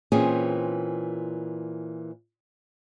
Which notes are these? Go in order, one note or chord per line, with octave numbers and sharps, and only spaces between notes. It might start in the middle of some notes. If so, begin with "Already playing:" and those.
A#2 E3 C4 C#4 G#4